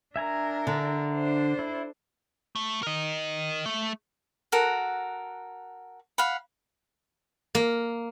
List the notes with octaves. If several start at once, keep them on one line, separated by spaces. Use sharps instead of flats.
D4 A#4 E5 G#5 A#5
D3
D4 C5
E4
A3
A#4 D#5
A3
F#4 A4 A#4 F#5
F5 F#5 B5
A#3